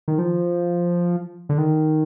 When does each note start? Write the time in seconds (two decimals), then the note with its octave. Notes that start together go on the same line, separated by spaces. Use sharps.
0.08 D#3
0.18 F3
1.49 D3
1.58 D#3